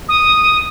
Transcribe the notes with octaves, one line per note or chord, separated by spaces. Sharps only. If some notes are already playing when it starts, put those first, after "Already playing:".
D#6